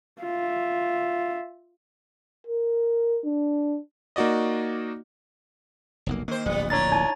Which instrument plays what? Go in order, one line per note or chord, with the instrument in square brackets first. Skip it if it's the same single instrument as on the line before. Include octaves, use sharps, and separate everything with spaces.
[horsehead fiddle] F4 E5
[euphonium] A#4
D4
[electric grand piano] A#3 D#4 F#4 D5 D#5
[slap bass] F1 B1 A#3
[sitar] D#3 C5 [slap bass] A#3
[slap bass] D1 A#1 [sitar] G3 B3
[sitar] A#2 D4 E4 [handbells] C#5 A#5 A6
[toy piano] D#4 A5